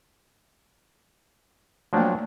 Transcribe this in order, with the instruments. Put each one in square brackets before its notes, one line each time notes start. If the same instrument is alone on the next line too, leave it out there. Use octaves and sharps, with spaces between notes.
[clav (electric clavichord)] F3 F#3 D4 [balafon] A3 A#3